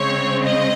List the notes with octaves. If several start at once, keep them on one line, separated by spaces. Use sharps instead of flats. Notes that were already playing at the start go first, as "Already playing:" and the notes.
Already playing: C#3 G#3 C4 C#5
D#5